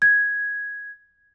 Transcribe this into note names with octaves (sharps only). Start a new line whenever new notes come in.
G#6